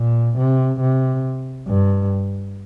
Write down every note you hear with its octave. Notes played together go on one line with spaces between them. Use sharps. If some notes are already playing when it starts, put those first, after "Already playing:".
Already playing: A#2
C3
C3
G2